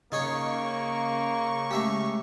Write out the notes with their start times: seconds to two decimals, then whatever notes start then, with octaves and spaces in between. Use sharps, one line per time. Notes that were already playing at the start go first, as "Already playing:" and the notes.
0.12 C#3 A#3 D#4 G#4 C#5 C#6
1.71 G#3 A3 G4 E5 A#5